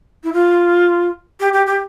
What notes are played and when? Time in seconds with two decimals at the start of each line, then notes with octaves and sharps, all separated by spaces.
0.24 E4
0.33 F4
1.40 G4
1.53 G4
1.67 G4